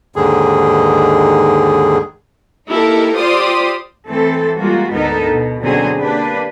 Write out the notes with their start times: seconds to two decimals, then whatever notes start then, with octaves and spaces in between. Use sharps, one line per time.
0.16 D#2 G#2 D3 D#3 G#4
2.68 A#3 D#4 E4 G4 A4 A#4
3.15 F4 G4 C5 D5 C6 D#6
4.07 E3 A3 C4 A4
4.60 G3 G#3 A#3 F4 F#4
4.92 D2 G#2 B3 D#4 A4 A#4
5.31 B2
5.62 B2 D3 F#3 C4 C#4 G#4
6.00 A#3 D4 G4 B4